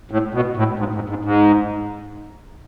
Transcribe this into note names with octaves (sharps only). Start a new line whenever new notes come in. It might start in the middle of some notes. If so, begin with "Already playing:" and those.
A2
B2
A2
G#2
G#2
G#2
G#2